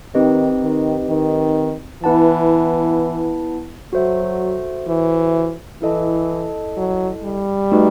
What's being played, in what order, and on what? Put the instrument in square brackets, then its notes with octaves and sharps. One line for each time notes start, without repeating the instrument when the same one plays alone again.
[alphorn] D#3 [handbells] C4 D#4 G4 B4 D#5
[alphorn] D#3
D#3
[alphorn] E3 [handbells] B3 E4 B4 F#5 A5
[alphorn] F#3 [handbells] F#4 A4 C5 E5
[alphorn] E3
[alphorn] E3 [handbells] E4 A4 D#5 A5
[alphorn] F#3
G3
[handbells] A3 D#4 F#4 B4 D#5